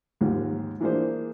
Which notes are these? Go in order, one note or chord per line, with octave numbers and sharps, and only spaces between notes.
D#2 G#2 F3 F4 G4
E3 A#3 D4 F4 G#4 C5